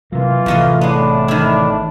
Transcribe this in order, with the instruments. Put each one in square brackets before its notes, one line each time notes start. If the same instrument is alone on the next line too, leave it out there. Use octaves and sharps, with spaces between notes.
[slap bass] C3 F#3 [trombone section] E3 A#3 F4
[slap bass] A1 C3 [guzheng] E2 A3 D#5
[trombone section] A2 D4 [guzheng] G#3 B3
[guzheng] D#3 E4